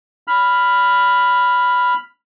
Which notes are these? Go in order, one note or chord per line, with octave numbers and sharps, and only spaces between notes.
B5 F6